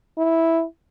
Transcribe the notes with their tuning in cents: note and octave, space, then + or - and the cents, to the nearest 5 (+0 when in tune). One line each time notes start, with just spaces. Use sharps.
E4 -5